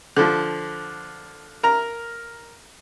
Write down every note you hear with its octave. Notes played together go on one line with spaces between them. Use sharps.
D3 F3
A#4 A#5